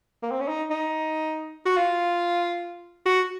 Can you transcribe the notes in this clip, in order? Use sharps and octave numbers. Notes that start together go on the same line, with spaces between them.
A#3
C4
C#4
D#4
D#4
F#4
F4
F#4